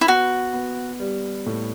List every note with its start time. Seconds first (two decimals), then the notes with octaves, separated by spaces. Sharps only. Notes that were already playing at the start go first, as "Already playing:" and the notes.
0.01 E4
0.07 B3 F#4
0.53 B3
1.00 G3
1.46 A2